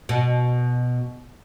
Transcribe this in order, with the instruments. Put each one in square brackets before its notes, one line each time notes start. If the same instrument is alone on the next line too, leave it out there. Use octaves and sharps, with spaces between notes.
[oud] B2